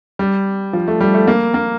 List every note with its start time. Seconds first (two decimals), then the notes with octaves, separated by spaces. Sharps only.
0.19 G3
0.73 F3
0.88 A3
1.01 G3
1.14 A3
1.28 A#3
1.54 A#3